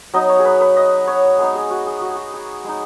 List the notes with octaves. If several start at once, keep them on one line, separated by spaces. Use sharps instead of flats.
F#3 B3 D#4 D#5
C#5
G#4
B4
B4
D#5
C#5
G#3 B3 D#4 G#4
G#4
F#4
G#4
F#4
G#4
F#4
G#4
G#3 D#4